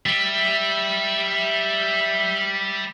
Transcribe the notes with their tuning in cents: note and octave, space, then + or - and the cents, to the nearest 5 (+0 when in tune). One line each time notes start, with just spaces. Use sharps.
G3 +0 E5 +0